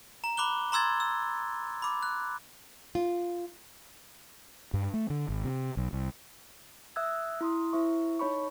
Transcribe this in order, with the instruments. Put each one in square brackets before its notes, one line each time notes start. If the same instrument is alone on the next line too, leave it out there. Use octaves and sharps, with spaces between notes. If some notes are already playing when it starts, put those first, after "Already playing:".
[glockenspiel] A#5
B5 D6 F#6 G7
A#5 C6 E6 G#6 A6
E6
B5 D6
F#6
[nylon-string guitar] F4
[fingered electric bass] G2
A3
D3
G#1
C3
B1
C2
[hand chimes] E5 D#6 E6 F#6 G#6
E4 C6 D#6
E4 C5 E5 C#6
D#4 C#5 B5 C#6